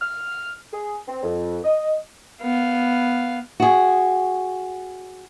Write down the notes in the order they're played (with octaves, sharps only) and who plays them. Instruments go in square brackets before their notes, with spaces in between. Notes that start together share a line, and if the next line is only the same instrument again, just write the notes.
[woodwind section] F6
G#4
C4
F2
D#5
[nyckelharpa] B3 F5
[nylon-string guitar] F#4 G#4